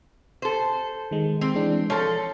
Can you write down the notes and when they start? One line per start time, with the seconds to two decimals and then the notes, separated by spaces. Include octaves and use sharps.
0.42 A4 C5
1.11 D#3 G#3
1.41 C4
1.55 E3 G#3 D4
1.90 F3 A4 C#5